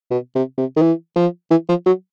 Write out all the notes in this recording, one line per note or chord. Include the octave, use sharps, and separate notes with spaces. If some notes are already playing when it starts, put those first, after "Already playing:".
B2
C3
C3
D#3
E3
F3
E3
F3
F#3